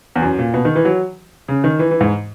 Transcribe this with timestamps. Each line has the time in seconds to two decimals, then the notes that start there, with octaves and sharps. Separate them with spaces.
0.16 E2
0.22 F#2
0.39 A#2
0.54 B2
0.65 D#3
0.76 E3
0.85 F#3
1.48 C#3
1.64 D#3
1.79 E3
1.91 E3
2.00 G#2